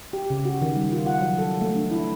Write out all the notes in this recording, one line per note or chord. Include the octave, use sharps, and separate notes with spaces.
G4
C#3
F#4
D#3
G3
F4
F#5
F#3
A4
A3
D4
E4